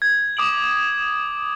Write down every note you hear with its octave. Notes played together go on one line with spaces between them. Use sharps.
G#6
D6 D#6 D7 F#7